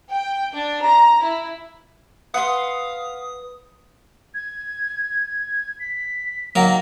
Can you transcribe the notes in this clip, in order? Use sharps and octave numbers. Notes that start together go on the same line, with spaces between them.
G5
D4
A#5
E4
B4 F5 F#5 C6 D#6
G#6
B6
D#3 F#3 A#3 A#6